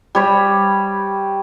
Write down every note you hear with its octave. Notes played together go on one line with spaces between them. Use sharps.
G3 C#5 B5